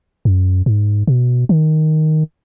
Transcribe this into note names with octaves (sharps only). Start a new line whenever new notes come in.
F#2
G#2
B2
D#3